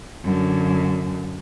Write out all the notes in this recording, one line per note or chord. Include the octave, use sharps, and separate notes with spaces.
F#2 D3